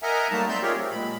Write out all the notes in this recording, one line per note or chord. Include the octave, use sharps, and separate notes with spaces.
A#4 D#5 E5 F#5 G#5 A#5
F#3 G3 A3 A#3 D#4 A5
C4 D5 E5 A#5 C6 G6
D#4 F4 G4 G#4 A#4 C#5
F#3 A3 C4
A#2 G#3 B5